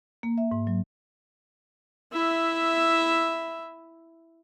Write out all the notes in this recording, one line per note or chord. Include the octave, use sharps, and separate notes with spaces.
A#3
E5
G#2
F#3
E4 E5